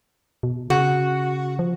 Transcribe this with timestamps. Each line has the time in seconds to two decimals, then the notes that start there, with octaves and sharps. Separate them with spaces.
0.43 B2
0.70 C#3 F#4
1.59 F3